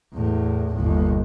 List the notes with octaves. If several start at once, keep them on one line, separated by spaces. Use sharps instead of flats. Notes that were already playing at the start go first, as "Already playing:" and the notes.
E2 A2
G1 D#2